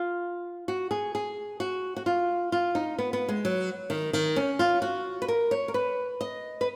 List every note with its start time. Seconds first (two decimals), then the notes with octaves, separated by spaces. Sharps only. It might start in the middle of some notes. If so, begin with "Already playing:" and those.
Already playing: F4
0.68 F#4
0.91 G#4
1.15 G#4
1.60 F#4
1.97 F#4
2.06 F4
2.52 F4
2.75 D#4
2.98 B3
3.13 B3
3.28 G#3
3.45 F#3
3.90 D#3
4.13 D#3
4.36 C#4
4.59 F4
4.82 F#4
5.22 B4
5.28 A#4
5.51 C#5
5.68 A#4
5.74 B4
6.21 D#5
6.61 B4